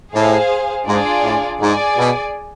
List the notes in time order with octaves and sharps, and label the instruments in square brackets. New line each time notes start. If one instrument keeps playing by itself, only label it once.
[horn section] A2 [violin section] G#4 C5 F5
[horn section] G#2 [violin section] D4 F4 G#4 D5
[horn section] A2
[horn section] G#2 [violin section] G#4 D5 G#5
[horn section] B2